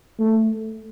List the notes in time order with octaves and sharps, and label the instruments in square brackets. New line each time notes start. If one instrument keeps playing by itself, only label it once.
[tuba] A3